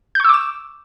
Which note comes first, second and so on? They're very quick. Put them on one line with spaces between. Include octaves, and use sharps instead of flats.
G6 C#6 E6 D6 E7